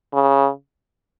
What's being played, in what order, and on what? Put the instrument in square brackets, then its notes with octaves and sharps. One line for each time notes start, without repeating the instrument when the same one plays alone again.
[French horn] C#3